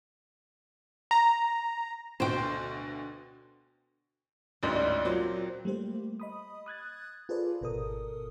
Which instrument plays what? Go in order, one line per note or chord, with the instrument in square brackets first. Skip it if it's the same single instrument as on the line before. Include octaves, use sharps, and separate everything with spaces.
[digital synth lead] A#5
[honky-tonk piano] D2 B2 D3 [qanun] C5 G5
[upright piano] A1 D2 G#2 [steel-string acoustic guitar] G3
[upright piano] A#2 F#3 [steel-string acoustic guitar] C4
[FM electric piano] G3 A3 A#3 G4 C5
D#5 B5 D#6
D#6 F#6 G#6 A6
F4 G#4 A4 B4 C5 D5
G#1 B2 A4 A#4 D#6